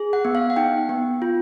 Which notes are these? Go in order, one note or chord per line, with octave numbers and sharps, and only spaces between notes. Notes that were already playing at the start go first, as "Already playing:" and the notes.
Already playing: G#4
F#5
B3
F5
F#5
D#4 G5
B3
F4